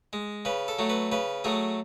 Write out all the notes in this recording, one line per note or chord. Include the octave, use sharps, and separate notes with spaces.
G#3
C#3 B4
A4
F#3 A3
B4
C#3 B4
F#3 A3 G#4